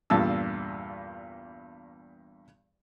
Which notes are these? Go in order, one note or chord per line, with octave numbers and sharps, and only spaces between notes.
E2 G2 A#2 A5 E6